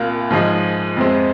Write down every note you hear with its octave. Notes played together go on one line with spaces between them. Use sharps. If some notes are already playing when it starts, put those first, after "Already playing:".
Already playing: C2 A#2 A#3 F4
G#2 F3 G#3 D#4
F2 C3 G#3 C4